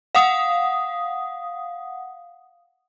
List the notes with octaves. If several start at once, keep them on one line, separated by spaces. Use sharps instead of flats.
F5 F#5 D#6